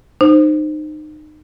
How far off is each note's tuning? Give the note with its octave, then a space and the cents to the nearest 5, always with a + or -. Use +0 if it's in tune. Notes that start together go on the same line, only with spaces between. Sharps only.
D#4 -30 C5 +0